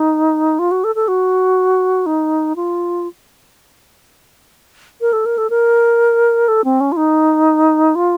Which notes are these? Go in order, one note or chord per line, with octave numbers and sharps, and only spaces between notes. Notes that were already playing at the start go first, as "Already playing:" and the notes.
Already playing: D#4
F4
F#4
A4
A4
F#4
D#4
F4
A#4
A4
A#4
A4
A#4
A4
C4
C#4
F4
D#4
F4